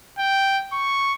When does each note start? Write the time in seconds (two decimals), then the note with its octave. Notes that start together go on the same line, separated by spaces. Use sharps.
0.18 G5
0.73 C#6